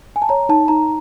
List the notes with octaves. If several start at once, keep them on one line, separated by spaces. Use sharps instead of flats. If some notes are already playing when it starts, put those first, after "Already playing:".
G#5
A5
C#5 A#5
D#4 A5
D#4 A#5